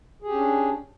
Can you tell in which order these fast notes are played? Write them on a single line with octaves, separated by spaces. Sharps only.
G#4 G4 C#4 D4